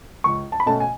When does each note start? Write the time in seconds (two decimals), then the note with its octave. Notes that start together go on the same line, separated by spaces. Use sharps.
0.24 C#2 C#6
0.52 A5
0.60 B5
0.66 B2 A3 C#4 A5
0.80 G#5